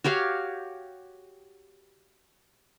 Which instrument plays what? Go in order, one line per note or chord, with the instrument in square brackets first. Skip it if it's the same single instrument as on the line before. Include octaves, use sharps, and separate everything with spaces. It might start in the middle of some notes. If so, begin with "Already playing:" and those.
[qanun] F#4 G4 C#5 F5